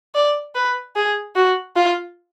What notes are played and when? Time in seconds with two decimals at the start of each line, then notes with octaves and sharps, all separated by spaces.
0.15 D5
0.55 B4
0.96 G#4
1.35 F#4
1.76 F4